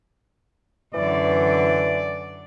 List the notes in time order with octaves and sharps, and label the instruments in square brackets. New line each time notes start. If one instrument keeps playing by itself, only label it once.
[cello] F#2 D3 [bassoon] E3 [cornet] D5